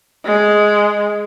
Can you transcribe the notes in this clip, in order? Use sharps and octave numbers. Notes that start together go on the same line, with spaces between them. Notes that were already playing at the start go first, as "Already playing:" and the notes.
G#3